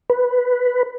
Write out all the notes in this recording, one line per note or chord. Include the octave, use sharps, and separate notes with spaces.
B4